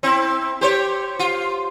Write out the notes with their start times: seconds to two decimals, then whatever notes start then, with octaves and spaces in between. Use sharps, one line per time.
0.03 C4 E4
0.61 G4 C5 C#5
1.19 F4